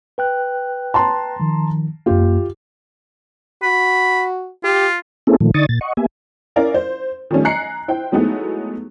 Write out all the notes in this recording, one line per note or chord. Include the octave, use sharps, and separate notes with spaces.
B4 G5 F#6
A5 A#5 C6
D#3 F3
F#2 A#3 F4 G4
F#4 B5
F4 G4
A#3 C4 C#4 E4 G#4 A4
A#2 D#3 F3 A3
D3 D#4 D5 C#6 D#6 A6
A#2 A6
D#5 F#5 C#6
A#3 B3 G4 E5 G#5
C#4 E4 A#4 D5 F5
C5
D#3 F3 G3 A3 C#4
G#5 A#5 F#6 C7 C#7
E4 C5 G5
F#3 G#3 A3 B3 D#4 E4